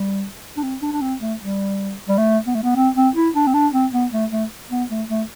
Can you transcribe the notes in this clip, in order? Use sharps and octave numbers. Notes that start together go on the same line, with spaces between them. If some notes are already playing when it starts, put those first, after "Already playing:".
Already playing: G3
D4
C4
D4
D4
C4
A3
G3
G3
A3
B3
A3
B3
C4
C4
E4
D4
C4
D4
C4
B3
A3
A3
B3
A3
A3